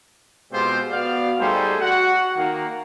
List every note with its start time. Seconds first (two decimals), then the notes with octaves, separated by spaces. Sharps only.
0.52 B2 G#3 C4 F4 G4 C5
0.91 B3 F#4 D5 F5
1.40 G3 A3 D#4 G#4 A4 C5
1.81 F#4 F#5
2.37 D#3 A#3